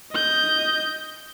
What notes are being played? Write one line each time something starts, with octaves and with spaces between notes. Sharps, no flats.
D#5 G6